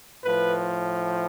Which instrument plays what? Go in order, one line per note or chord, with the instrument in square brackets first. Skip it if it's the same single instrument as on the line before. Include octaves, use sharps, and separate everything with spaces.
[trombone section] A2 F3 B4